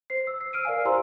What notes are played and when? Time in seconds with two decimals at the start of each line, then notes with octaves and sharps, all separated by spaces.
0.10 C5 C7
0.27 E6
0.41 C7
0.53 E6 F6 D7 D#7
0.65 A#4 D5 F5 G#5
0.85 E4 G4 C5 A#5 C6 E6